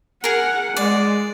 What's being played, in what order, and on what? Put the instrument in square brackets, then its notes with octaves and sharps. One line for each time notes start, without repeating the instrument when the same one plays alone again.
[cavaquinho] G#4 A#4 [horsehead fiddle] F#5
[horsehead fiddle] G#3 [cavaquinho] D5